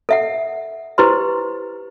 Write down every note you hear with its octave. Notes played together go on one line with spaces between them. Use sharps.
A4 E5 F#5
E4 G4 G#4 B4 C5 C6